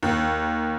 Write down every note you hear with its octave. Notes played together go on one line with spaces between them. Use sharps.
D#2